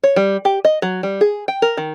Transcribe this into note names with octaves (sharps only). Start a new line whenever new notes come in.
C#5
G3
G4
D#5
F#3
G3
G#4
G5
A#4
D#3